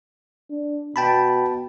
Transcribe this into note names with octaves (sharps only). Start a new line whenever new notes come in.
D4
B2 G5 A5 B5